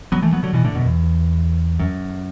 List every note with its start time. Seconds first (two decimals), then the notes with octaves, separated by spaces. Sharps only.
0.12 F#3 B3
0.22 E3 A3
0.33 F#3 B3
0.43 D3 F#3
0.53 B2 E3
0.64 A2 D3
0.74 F#2 B2
0.85 E2
1.79 F#2